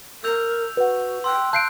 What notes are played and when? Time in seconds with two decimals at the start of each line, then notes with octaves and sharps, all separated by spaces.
0.24 A#4 E6 G6 F7
0.77 F#4 B4 F#5
1.24 G5 C6 E6 F#6
1.53 F5 A5 F#6 G6 C7 D7